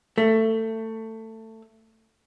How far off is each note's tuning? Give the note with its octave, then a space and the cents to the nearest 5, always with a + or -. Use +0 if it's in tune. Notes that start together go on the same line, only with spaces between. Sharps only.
A3 +20